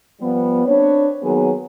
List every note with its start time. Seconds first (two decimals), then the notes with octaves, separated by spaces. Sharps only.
0.20 F3 G3 B3
0.65 C4 D4 B4 C#5
1.21 D#3 F#3 A#3 B3 G#4 B4